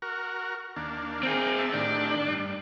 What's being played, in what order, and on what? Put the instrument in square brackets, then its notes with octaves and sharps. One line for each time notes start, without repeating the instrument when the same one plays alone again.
[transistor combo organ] F#4 A#4
D#2 A#3 D4
[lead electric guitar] C4 G#4 [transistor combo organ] A#4 G5
[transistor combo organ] E5 A5
[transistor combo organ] A2 D#3 G4 [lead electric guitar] D4
[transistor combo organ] G2